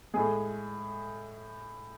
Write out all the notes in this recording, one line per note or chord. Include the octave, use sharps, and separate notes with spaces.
A2 G#3 G#4